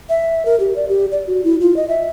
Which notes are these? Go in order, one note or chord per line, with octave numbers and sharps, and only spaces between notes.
E5
A#4
G4
D5
G4
D5
F#4
E4
F4
D#5
E5